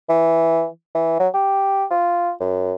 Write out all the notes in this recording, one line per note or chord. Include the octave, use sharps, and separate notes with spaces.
E3
E3
F#3
G4
F4
F#2